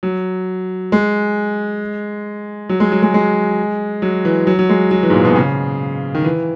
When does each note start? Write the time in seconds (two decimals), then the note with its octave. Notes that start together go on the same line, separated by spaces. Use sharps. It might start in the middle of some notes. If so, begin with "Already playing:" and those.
0.03 F#3
0.92 G#3
2.69 F#3
2.80 G#3
2.92 F#3
3.03 G#3
3.14 G#3
4.02 F#3
4.25 E3
4.47 F#3
4.59 F#3
4.69 G#3
4.91 F#3
5.03 E3
5.10 G#2
5.14 A#2
5.25 B2
5.36 C#3
6.15 D#3
6.24 E3